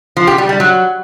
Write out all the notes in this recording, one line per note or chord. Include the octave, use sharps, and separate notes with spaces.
F3
G4
G3
G3
F#3